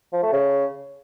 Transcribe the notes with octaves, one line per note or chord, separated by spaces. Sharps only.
F3
A3
C#3